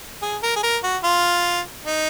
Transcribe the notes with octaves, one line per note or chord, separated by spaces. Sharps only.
G#4
A#4
G#4
A#4
F#4
F4
D#4